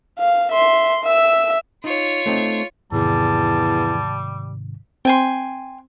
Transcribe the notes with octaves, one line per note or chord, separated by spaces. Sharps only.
F5
E5 C6
E5 E6
D#4 F4 C#5
A3 C4 D#4
E2 G#2 C3 D#3 G3 A5
C4 G5 G#5 C6